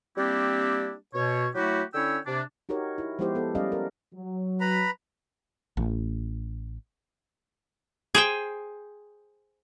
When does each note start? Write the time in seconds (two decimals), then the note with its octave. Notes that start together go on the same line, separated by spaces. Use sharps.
0.17 G3 A#3 C4 D4 E4 G4
1.14 B2 C#5
1.55 F#3 A3 E4 F#4 G4
1.94 D3 C#4 E4 C#5 G5 E6
2.27 C3 D4
2.69 D#4 F#4 G4 A#4 C#5
2.98 E4
3.19 F3 G#3 B3 E4 G4 C5
3.35 B3 A4
3.55 G3 C#4 D5 D#5 F5
3.72 A#4
4.14 F#3
4.61 B4 A#5 B5
5.77 A1
8.15 G#4 C5 G5